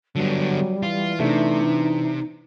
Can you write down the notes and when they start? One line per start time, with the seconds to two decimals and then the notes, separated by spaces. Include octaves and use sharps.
0.16 D3 F#3 G3 B3
0.83 E3 F4
1.20 C3 A3 D4 D#4
1.60 D4